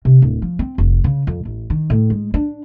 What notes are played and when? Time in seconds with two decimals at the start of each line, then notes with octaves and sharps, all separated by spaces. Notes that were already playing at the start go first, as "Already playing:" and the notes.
0.05 C3
0.22 D1
0.42 F3
0.59 C4
0.78 F1
1.04 C#3
1.27 F2
1.45 A1
1.70 D#3
1.90 A2
2.10 G#3
2.34 D4